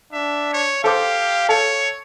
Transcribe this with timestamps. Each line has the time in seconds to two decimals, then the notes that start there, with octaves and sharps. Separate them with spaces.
0.13 D4 E5
0.53 C#5
0.84 G4 A4 C5 F5 D6
1.49 A4 C#5